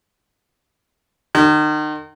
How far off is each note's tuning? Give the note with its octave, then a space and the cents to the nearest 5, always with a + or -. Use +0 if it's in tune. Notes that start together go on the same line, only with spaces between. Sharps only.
D#3 -35